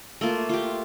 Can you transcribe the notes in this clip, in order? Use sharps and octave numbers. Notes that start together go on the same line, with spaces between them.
A3 A#3 F4
F4 G4